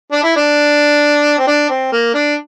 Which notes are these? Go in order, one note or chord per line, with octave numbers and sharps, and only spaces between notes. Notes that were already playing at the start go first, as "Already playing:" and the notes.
D4
E4
D4
C4
D4
C4
A#3
D4